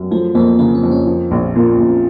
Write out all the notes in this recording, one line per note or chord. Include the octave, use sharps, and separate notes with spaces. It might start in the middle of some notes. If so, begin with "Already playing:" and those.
Already playing: F#2
F3 A3
F2 A#3
C#3 A#3
C4
F2
C#4
F3
A#1
A#2
A#1